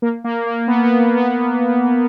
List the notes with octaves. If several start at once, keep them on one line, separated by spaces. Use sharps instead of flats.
A#3
A#3
A#3
B3
B3
A#3
B3